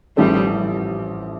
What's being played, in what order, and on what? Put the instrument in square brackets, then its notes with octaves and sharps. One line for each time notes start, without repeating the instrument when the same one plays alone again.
[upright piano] A1 A2 F3 A3 [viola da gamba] E3 G3